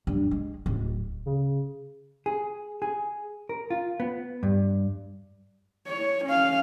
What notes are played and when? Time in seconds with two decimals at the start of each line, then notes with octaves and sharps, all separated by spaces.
0.07 G2
0.31 G#3
0.66 D1
1.26 C#3
2.26 G#4
2.82 G#4
3.49 A#4
3.70 F4
4.00 B3
4.43 G2
5.87 C#5
6.25 C#4 F5